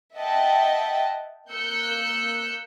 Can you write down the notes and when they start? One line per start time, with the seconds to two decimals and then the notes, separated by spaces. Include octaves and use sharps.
0.17 D#5 E5 F#5 G5 A5
1.52 A#3 E6 F#6 G6 C#7